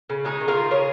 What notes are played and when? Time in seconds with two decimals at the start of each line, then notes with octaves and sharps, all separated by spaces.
0.10 C#3
0.25 G#3 D#4 G#4
0.40 D#3
0.48 F4 A#4
0.56 D#3
0.71 C#3 G#4 C#5